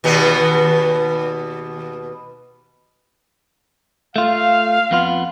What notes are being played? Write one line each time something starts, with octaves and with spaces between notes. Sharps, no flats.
D#2 B2 B3
A3 F4 F5
F2 B3 F4